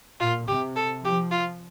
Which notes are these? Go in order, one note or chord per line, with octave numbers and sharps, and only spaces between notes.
A#2 F4
C3 G4
A4
F3 G4
F4